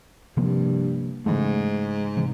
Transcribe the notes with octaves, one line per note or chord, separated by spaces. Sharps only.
G2 C3 F3 A#3
G#2 C#3 E3 A3
C3 E3